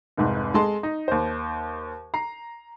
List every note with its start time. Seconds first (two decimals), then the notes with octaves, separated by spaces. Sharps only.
0.17 F1 C2 G#2
0.54 G#3 A4 A5 C6
0.83 D#4
1.08 D#2 C5
2.14 A#5 C7